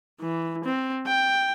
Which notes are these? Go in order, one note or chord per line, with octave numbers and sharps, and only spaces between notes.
E3
C4
G5